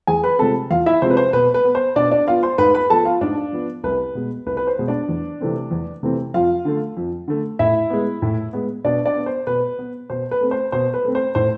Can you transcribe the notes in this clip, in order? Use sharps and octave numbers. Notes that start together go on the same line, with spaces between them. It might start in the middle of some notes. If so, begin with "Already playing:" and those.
E2 G#4 G#5
B4 B5
C3 F3 G#3 C4 A4 A5
E2 F4 F5
E4 E5
C3 F3 G#3 C4 C5
B4
C5
B2 B4
B4
B3
C5
B2 D4 D5
D4 D5
B3 F4 F5
C5 C6
G#2 B4 B5
B4 B5
F3 B3 A4 A5
F4 F5
G#2 D4 D5
F3 B3
C2 B4
B2 G#3 B3
C2 B4
B4
C5
B2 G#3 B3
D4 D5
E2
C3 E3 A3 C4
E2
C3 E3 A3 C4
F2 F4 F5
D3 A3
F2
D3 A3
A2 E4 E5
G#3 B3
A2
G#3 B3
B2 D4 D5
D4 D5
B3
C5
B2 B4
B3
B2 C5
B4
A3 C4
C5
B2 C5
B4
A3 C4
C5
A2 C5